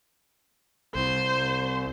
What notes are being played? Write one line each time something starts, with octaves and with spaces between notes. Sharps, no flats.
C2 C5